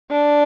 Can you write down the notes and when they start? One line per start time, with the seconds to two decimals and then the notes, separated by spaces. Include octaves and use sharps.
0.11 D4